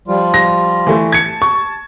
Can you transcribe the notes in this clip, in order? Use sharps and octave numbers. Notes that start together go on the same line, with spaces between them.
F3 G3 F4
A#6
E3 A3
A5 G#6 C#7
C#6